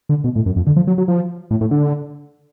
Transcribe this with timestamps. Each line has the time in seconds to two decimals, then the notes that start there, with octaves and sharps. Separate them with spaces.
0.09 D3
0.24 B2
0.36 A2
0.46 F#2
0.56 F2
0.67 D3
0.76 F3
0.87 F#3
0.98 F#3
1.08 F3
1.51 A2
1.61 A2
1.71 D3